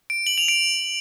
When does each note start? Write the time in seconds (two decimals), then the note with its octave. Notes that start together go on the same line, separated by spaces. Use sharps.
0.10 D7
0.27 F#7
0.38 F7
0.48 D7